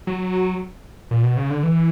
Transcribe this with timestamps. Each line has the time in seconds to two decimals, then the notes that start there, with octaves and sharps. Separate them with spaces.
0.07 F#3
1.11 A#2
1.23 B2
1.37 C#3
1.50 D3
1.63 E3